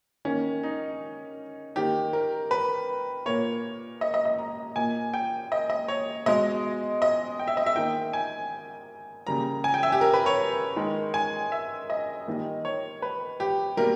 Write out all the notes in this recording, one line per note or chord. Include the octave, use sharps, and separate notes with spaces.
D#3 A#3 C#4
D#4
D#3 A#3 G4
A#4
B4
A#2 A#3 C#5
D#5
D#5
D#5
A#5
A#2 A#3 G#5
G5
D#5
D#5
C#5
B2 G#3 D#5
D#5
G5
E5
D#5
E5
D#3 A#3 G5
G#5
C#3 G3 A#3 A#5
G#5
G5
E5
G4
A#4
B4
C#5
D#3 G#3
G#5
E5
D#5
D#3 G3 A#3
C#5
B4
G4
B2 G3 A#3 A#4